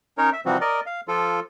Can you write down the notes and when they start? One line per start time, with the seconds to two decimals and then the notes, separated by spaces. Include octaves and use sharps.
0.18 C#4 D#4 A#4 C#5
0.33 E5
0.46 C3 E3 F3 G3 C4 F#4
0.61 A#4 D5 D#5
0.86 F5
1.08 F3 F4 A4